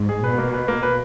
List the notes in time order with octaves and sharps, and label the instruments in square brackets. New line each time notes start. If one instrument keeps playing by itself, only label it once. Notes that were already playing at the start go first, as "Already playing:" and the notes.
Already playing: [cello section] G#2
[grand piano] G#4
[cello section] B2 [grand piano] B4
[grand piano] A#3
B4
A#3
B4